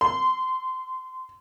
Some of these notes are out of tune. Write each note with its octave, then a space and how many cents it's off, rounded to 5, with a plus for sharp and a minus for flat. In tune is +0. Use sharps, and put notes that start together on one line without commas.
C6 -20